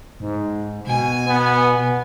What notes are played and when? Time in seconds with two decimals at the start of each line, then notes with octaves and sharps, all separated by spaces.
0.20 G#2
0.87 B2 G#5
1.27 B3